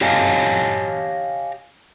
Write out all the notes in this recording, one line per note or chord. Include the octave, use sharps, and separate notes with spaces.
G4 C#5 D#5 F5 G#5 A5